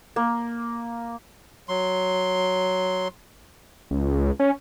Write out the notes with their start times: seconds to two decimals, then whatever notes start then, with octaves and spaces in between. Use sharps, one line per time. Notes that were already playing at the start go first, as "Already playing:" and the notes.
0.16 A#3
1.69 F#3 C6
3.91 C#2
4.40 C#4